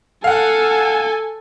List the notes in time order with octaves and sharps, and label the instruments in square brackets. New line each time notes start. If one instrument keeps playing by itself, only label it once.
[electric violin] A4 G#5 [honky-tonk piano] F5 F#5